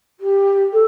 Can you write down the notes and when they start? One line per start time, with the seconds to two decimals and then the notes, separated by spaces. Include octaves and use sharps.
0.20 G4
0.72 A4